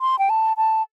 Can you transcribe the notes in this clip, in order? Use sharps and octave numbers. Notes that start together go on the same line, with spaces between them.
C6
G5
A5
A5